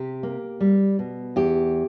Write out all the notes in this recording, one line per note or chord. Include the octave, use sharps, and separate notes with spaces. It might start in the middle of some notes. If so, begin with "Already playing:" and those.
Already playing: C3 G4
A#3
G3
B2
E2 G4